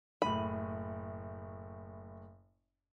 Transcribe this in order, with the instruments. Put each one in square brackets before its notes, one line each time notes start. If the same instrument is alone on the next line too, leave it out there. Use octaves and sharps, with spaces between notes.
[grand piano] F#1 A2 D#7 [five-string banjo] B5